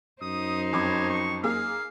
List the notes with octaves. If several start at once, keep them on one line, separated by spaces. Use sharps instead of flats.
F#2 D#4 C5 D#6
F2 C#5 B5 D6
C#6
A#3 G#4 F5